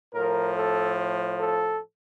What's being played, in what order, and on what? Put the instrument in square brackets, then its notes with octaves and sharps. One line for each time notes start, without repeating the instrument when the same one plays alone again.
[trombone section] A2 F3 A#4
A4
A4